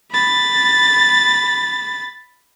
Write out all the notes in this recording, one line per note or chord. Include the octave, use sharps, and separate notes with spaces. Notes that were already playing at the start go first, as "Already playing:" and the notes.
B5 A6